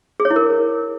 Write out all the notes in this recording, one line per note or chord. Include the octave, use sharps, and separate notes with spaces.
G#4
C#5
E4
A#4